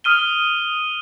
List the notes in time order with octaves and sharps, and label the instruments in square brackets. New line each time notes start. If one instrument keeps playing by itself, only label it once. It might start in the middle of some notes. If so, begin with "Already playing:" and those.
[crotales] D#6 F6 D#7 G7